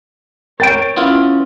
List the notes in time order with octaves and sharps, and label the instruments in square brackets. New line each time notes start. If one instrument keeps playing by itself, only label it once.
[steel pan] A#4 G5 [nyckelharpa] C#5 [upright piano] A6 D7
[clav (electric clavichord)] B3 E4 F4 [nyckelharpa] C#4